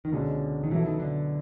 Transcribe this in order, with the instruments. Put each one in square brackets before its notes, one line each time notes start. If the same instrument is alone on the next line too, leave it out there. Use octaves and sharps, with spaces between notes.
[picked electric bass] D#3
[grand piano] C#2 B2 G#3 C#4 [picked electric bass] D3
[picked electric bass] D#3
[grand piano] B2 F#3 B3 E4 A4 [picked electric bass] E3
[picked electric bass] D#3
D3